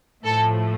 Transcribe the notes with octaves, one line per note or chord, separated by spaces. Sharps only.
A2 F3 A3 A4